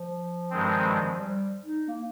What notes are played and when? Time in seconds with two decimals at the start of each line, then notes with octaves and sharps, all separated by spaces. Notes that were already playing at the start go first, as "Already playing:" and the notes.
Already playing: F3
0.51 G2 D#3 G#3 C4
1.19 G3
1.65 D#4
1.88 A#3